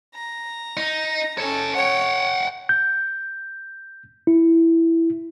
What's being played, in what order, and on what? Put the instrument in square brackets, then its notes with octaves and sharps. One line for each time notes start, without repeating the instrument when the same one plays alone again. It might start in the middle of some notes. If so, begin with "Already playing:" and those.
[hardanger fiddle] A#5
[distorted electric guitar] D#4
[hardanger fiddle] C#4 A4 [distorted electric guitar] C#5 A5
[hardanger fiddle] C#5 [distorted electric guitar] F#5 G5
[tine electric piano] G6
E4